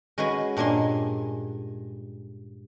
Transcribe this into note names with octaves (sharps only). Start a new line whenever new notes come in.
G#3 C#4 F#4 B4 G#5
G2 A#2 G#3 G#5 C6